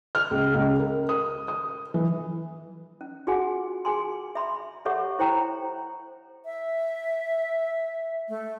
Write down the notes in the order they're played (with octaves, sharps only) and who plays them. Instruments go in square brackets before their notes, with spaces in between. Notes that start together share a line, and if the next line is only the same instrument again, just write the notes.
[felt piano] F6
C#2
C#2
A#4
D#6
D#6
E3
[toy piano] C#4
F4 F#4 G#4 F#5 G#5
G#4 G#5 C6
E5 B5 C6
G4 A4 C#5 E5 F#5 C#6
E4 C5 C#5 G5 A#5 B5
[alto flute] E5
A3